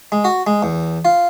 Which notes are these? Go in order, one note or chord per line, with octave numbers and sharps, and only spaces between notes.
G#3
F#4
G#3
E2
F4